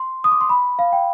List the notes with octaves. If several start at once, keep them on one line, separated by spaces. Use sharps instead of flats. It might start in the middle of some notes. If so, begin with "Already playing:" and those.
Already playing: C6
D#6
D6
C6
B5
F5
G5